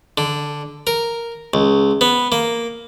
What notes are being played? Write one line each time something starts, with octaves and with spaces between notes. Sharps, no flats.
D3
A#4
C#2
B3
A#3